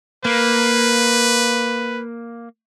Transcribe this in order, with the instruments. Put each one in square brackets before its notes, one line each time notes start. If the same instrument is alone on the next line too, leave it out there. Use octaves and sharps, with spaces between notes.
[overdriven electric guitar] A#3 [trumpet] B4